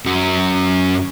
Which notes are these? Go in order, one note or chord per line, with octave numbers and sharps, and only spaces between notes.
F#2 F#3